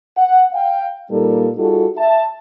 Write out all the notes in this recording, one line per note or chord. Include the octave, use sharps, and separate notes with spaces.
F#5
F5 G5
A#2 G3 A#3 D#4 A4 A#4
G3 D#4 F4 F#4 G#4 A4
E5 A5